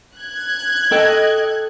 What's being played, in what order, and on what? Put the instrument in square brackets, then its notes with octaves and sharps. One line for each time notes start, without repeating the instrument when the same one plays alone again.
[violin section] F#6 G#6
[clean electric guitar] A4 G5 [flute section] D#5